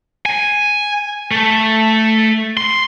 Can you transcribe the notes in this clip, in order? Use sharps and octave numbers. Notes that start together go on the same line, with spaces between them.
G#5
A3
C6